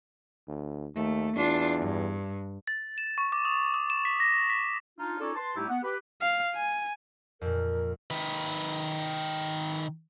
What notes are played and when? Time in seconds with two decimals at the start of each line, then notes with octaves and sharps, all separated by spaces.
0.48 D2
0.95 D#2 A3
1.36 E2 D4 F4
1.79 G2
2.67 A6
2.98 E7
3.18 C#6
3.32 D6
3.45 D#6
3.74 D#6
3.90 E7
4.05 B6
4.20 A#6
4.50 B6
4.99 D4 D#4 F4
5.20 C#4 D#4 F4 A4 C#5 D5
5.35 B4 A5 C6
5.56 A2 G3 A3 D#4 E4 G4
5.69 B3 F#5
5.83 G4 B4
6.22 F5
6.55 G#5
7.41 F2 A#2 A#4
8.11 D#3 B4